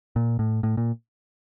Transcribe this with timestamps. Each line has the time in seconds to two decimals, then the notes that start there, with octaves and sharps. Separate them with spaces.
0.16 A#2
0.39 A2
0.63 A2
0.77 A#2